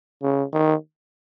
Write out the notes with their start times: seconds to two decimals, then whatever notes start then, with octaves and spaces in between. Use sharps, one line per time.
0.23 C#3
0.53 D#3